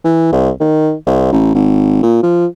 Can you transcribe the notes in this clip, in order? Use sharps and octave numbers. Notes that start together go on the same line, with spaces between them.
E3
C2
D#3
C2
A1
G#1
A#2
F3